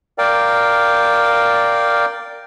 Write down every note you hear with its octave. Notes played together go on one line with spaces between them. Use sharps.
A#4 D5 F5 G5